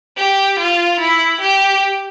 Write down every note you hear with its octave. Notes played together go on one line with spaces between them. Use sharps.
G4
F4
E4
G4